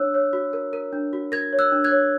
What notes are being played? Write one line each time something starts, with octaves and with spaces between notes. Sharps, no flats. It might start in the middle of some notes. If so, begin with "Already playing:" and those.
Already playing: D4 C#5 E6 F#6
C#5
F#4
A#4
A#4
D4
F#4
A#4 G#6 A#6
C#5
E6 F#6
D4
F#6 G#6
C#5